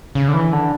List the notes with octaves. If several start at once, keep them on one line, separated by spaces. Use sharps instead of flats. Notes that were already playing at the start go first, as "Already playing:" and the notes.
C#3
D3
E3
D3